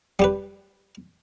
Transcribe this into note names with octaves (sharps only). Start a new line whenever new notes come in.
G3 G4 B4